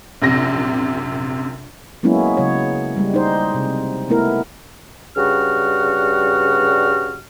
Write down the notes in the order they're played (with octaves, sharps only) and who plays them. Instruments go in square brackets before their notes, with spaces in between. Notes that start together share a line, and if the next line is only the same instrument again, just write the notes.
[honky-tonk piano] A#1 F#2 C3 A#6
[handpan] F#3 G#3 A#3 B3 C#4 E4
C#3 F#3 C#5
G3 G#3
D#4 C5
C3
A3 B3 E4 A#4
[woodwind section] G2 C#3 G3 F#4 F6